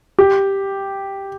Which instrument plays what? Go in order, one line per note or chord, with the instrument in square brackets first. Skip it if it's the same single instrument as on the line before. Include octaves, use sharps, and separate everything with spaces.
[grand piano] G4